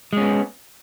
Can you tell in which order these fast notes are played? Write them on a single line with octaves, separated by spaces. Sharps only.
G#3 C#4 B3